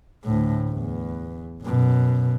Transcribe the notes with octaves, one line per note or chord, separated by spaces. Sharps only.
D2 A2
E2
F#2 B2